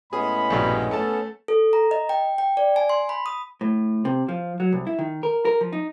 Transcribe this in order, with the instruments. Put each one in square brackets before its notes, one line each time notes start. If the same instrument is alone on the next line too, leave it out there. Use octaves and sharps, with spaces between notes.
[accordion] A2 G#3 [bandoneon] B3 C#4 [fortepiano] G#4 [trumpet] B5
[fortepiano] A#1 G2 B2
[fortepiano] A3 A5 [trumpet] A4
[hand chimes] A4
A#5
D#5
G5
G5
D5
G#5
C6
B5
D#6
[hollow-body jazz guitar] A2
C3
F3
F#3
C2
E4
D#3
A#4
A#4
F3
D#4